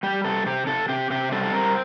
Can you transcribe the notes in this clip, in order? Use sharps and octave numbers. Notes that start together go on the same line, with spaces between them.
G3 G4
C3 A4
C3 G4
C3 A4
C3 G4
C3 G4
G3 A4
A4
C4 A#4